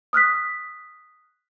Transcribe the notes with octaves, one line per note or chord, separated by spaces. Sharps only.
D#6 F6 F#6 B6